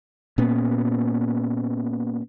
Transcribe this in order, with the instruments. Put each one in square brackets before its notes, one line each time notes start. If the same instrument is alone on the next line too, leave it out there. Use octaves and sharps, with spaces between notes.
[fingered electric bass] A#2 A#3 B3 C#4